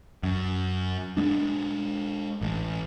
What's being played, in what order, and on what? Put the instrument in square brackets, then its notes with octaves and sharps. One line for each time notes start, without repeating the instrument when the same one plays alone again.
[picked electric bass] F#2
G#3 D4
A1